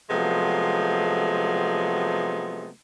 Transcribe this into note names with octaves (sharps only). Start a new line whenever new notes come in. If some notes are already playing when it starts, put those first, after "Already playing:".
C3 F3 F#3 G#3 A3 B3